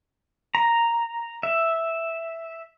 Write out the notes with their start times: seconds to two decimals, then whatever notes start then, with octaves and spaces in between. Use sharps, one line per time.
0.55 A#5
1.43 E5